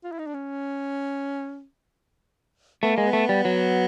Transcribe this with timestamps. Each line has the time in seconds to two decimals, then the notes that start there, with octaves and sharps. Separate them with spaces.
0.04 F4
0.12 E4
0.19 D#4
0.27 D4
0.34 C#4
2.83 A3 B3
2.94 G#3 A#3
3.06 B3
3.13 A3
3.29 G3
3.45 F#3